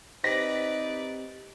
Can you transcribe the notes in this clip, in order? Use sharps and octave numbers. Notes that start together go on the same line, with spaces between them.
C4 D#4 G4 B4 D5 A#6 B6